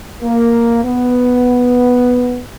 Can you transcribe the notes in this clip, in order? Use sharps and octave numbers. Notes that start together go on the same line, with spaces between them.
A#3
B3